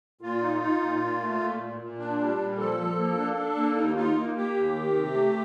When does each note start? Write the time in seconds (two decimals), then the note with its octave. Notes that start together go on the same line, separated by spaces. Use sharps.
0.21 A#2 F4
0.41 D#4
0.61 D#4
0.81 A#2
1.00 A#2
1.20 A3
1.40 A#2
1.59 A#2
1.79 A#2
1.98 D4
2.19 G3
2.38 A#2
2.58 F3 A4
2.78 F3
2.98 A#3
3.17 D4
3.37 D4
3.56 A#3
3.76 D#2 D#4
3.96 D#4 F4
4.16 A#3
4.35 A#3 G4
4.54 D#2
4.75 D#3
4.94 C3
5.14 A3